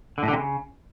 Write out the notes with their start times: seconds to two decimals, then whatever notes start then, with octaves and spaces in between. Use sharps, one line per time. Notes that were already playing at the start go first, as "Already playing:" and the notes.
0.18 D3
0.23 A2
0.28 D3
0.33 C3
0.38 C#3